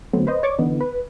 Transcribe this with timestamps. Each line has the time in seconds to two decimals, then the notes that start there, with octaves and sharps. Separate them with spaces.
0.13 D3 F#3 A3 B3 C4
0.27 B4 C5 D#5
0.43 C#5 D5 C#6 D6
0.58 D3 E3 B3 D#4
0.81 B4